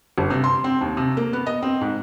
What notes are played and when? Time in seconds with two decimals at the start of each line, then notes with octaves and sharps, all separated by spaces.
0.18 G1
0.30 C3
0.44 C6
0.64 C4
0.81 D#2
0.97 C3
1.17 A#3
1.33 B3
1.46 D#5
1.62 C4
1.81 G#2